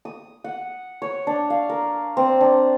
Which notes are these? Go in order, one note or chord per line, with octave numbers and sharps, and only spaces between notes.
D#6
F#5
C#5
D4
F5
A#4
C4
D4